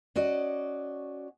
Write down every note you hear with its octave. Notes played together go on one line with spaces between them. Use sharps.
C#4 F#4 D5 D#5